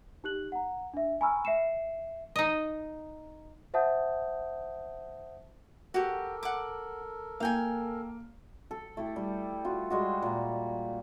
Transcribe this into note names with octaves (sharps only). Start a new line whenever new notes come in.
D#4 G4 F#6 F#7
F#5 A#5
D4 E5
G#5 A#5 B5 C#6 E6 F6
E5 C7 C#7 E7
D#4 D#5
C5 E5 F#5 A5 D#6 G6
F#4 G4 A4 A#4
F#5 D6
A#3 F5 G5 G#5
A4
A3 E4 G4
G3
F4 F#4
G3 G#3 F#4
A#2 A#3